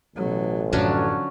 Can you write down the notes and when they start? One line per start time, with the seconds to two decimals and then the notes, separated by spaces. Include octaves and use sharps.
0.16 A1 B2 F#3
0.73 F#2 A2 D3 F3 F#3 C#4 D4